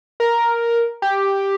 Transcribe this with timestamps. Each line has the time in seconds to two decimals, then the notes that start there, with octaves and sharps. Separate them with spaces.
0.20 A#4
1.02 G4